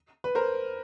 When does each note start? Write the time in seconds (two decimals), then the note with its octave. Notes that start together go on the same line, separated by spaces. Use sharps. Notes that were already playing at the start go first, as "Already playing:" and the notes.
0.24 B4
0.35 A#4 C5